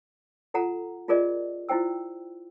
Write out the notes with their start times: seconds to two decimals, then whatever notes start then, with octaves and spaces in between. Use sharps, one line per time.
0.54 F4 A4 F#5 A#5
1.08 F4 G4 G#4 A#4 D5 D#5
1.69 E4 F4 C5 G5 E6